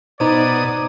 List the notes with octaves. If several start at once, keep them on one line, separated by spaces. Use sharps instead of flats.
B2 D#4 C5 D5 A#5 D#6 G#6